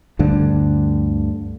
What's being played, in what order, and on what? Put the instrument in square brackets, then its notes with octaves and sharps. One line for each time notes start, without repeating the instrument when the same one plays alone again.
[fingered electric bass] D2 G2 D3